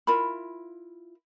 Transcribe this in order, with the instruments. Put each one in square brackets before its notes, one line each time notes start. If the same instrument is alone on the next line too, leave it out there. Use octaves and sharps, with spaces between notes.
[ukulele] E4 F4 A#4 B5